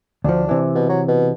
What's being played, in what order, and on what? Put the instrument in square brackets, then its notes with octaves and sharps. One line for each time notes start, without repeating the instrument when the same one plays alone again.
[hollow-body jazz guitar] D2 F3 [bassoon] D4
[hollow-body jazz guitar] C3 E3
[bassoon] B2
F#3
B2